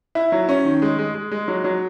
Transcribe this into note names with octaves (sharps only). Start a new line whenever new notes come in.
E4
F#3
C#4
D#3
G#3
G#3
G#3
G#3
F#3
F#3